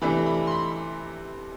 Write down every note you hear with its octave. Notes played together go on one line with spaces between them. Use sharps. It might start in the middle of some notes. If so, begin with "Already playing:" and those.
C3 E3 A3 D4 B5
B5
C6
B5